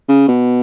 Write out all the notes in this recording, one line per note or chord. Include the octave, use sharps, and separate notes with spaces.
C#3
B2